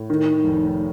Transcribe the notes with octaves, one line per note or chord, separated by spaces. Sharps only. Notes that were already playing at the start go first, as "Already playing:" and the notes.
Already playing: A2
D#3
F1